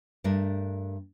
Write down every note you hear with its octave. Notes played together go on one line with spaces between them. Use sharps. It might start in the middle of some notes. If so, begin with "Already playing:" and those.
G2 A3 D4 A#4